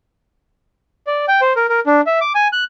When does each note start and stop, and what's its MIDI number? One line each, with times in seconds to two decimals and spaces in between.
1.07 1.25 74
1.28 1.41 79
1.41 1.53 72
1.56 1.66 70
1.69 1.80 70
1.86 2.01 62
2.06 2.19 76
2.21 2.33 86
2.35 2.48 80
2.53 2.64 90